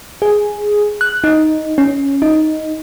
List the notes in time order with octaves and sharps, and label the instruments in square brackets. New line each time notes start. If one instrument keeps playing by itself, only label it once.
[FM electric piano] G#4
F#6
D#4
C#4
D#4